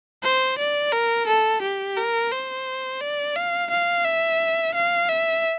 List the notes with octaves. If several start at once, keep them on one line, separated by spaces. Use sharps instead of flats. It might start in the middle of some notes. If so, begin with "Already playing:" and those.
C5
D5
A#4
A4
G4
A#4
C5
D5
F5
F5
E5
F5
E5